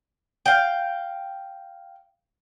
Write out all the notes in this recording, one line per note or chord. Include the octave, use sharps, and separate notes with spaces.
F5 G5